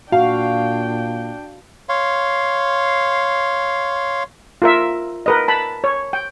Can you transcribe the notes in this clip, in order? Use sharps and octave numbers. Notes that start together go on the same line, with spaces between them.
A#2 D4 F#4 F5 G5
C#5 F5 C6
F4 A#4 E5
A#4 B4 D#5
A5 B5
C#5
G5